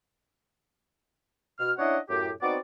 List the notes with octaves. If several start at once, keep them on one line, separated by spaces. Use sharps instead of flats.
B2 F6
C#4 D4 E4 C#5 D#5 F#5
F#2 A2 G4
B3 C4 D#4 F#4 D5